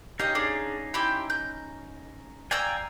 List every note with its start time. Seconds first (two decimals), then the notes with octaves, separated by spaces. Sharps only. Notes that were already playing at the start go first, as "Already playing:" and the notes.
0.20 C#4 D#4 G4 D#5 F5
0.35 D4 G#4
0.94 E4 G4 C6
1.30 G6
2.51 D5 F5 G5 G#5 A#5 E6